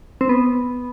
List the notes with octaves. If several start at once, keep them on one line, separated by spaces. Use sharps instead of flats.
C4
B3